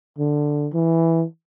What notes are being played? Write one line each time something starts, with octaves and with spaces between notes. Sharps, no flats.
D3
E3